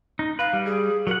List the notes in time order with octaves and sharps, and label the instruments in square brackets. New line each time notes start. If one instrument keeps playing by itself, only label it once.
[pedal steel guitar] D#4
[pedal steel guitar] B4 [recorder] F5
[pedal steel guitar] G3
[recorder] G#4
[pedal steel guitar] F#3 F#5 [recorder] A#4